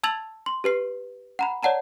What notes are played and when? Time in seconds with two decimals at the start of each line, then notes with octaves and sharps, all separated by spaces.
0.03 A5 E6 G#6 A6 F7 F#7
0.46 C6
0.64 G4 B4 C7
1.39 F#5 A#5 B5
1.63 C#5 D5 F#5 A5 A#5